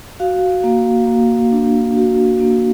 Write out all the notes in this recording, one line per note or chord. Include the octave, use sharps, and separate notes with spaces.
F#4 F5
A#3
A#3
D4
F#4
A#3